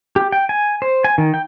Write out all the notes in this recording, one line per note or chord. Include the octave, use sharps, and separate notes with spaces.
G4
G5
G#5
C5
G#5
D#3
G5